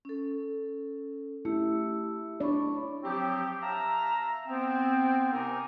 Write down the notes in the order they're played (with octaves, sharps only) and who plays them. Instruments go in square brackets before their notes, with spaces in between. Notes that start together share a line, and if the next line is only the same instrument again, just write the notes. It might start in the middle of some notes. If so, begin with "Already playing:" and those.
[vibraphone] C#4 A4
[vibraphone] A3 G4 E6 [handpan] E4
[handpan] D4 D5 [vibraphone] C#5 B5 C#6
[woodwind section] F3 F#3 C4 G4
E5 F5 A5 A#5
B3 C4
C3 B3 D#4 A#4 G#5